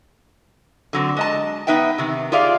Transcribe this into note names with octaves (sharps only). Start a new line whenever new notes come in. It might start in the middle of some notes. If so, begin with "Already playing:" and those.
D3 F#3 C4
G#3 D#5 A5
B3 D#4 B4 E5 G5
C3 D#3
F4 G4 G#4 D5 E5 F5